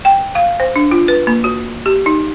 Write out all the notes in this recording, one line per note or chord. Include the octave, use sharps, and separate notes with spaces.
G5
F5
C5
D4
F4
B4
A#3
F#4
G4
D#4